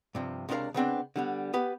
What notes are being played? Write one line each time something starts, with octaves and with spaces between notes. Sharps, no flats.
G2 C3 F3
C#2 C3 D4 G4 A#4 F5
C#3 B3 C4 D4
D3 G3 B3
B3 G4 B4